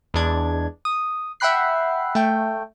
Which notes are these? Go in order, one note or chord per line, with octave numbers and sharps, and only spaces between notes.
E2 G#3 D4 G#6
D#6
E5 F#5 G5 B5 F#6 C7
A3 G5